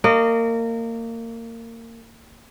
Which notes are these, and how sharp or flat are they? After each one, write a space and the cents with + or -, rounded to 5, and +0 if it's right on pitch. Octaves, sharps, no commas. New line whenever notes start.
A#3 -25 D#5 -35